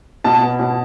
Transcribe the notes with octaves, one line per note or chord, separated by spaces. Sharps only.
B2 A5
B3
B2